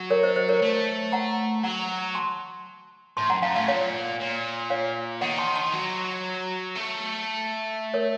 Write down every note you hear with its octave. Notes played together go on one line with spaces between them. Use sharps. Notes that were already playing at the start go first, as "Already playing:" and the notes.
Already playing: F#3
A#4 C#5
C5 D#5
C5 D#5
A#4 C#5
A3
F#5 A#5
F#3 F#5 A#5
A5 C6
A2 A5 C6
F#2 F#5 A#5
F#2 F5 A5
A2 F5 A5
A#2 C#5 F5
A#2
C#5 F5
D#3 D#5 F#5
A5 C6
A5 C6
F#3
A3
A#4 C#5